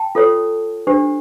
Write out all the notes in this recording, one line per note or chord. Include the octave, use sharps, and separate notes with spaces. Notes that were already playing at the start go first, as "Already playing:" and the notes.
Already playing: G5 A5
F4 A4 C#5
D4 G4 C5